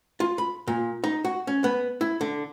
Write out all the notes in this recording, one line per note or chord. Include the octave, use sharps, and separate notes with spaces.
F4
B5
A#2
D#4
F#4
C#4
B3
E4
D3